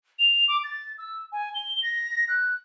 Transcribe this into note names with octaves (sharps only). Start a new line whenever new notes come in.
F7
D6
A6
E6
G#5
G7
A#6
F#6